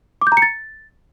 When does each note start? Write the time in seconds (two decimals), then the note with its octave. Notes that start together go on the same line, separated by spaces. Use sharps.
0.22 D6
0.27 G6
0.32 A#5
0.37 C#7
0.42 A6